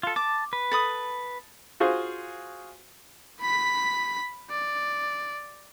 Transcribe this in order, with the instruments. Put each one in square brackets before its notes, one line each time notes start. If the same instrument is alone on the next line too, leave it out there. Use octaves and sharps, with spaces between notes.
[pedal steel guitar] F4 A4
[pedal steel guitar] A5 [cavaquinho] D6
[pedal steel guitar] B4
[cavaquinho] A4 B5 D#6
[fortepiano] F4 F#4 G#4 C5
[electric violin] B5 B6
D5